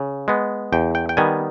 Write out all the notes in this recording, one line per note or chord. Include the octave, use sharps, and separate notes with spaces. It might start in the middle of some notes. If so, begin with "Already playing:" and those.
Already playing: C#3
G#3 B3
E2 G5
G5
G5
D#3 G3 B3 G#5